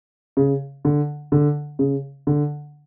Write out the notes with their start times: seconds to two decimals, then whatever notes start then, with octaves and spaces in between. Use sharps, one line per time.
0.37 C#3
0.85 D3
1.32 D3
1.79 C#3
2.27 D3